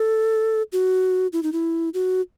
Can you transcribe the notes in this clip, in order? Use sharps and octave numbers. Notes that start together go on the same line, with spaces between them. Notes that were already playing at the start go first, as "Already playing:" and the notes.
Already playing: A4
F#4
E4
D#4
E4
F#4